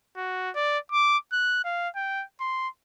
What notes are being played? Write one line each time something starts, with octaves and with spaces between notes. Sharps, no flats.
F#4
D5
D6
F#6
F5
G5
C6